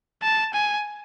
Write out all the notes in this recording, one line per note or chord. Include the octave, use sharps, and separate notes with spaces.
A5
G#5